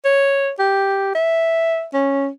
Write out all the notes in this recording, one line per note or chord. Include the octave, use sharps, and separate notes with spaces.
C#5
G4
E5
C#4